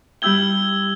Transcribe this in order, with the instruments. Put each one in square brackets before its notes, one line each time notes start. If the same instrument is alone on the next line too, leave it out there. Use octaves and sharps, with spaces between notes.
[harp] G3 E4 G5 [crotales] E6 G#6 G7